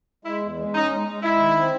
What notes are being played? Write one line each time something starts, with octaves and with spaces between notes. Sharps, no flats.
G#3 E4
E2
G#3
C#4 D#4
G#3
G#3
G#3 E4
D#3
C4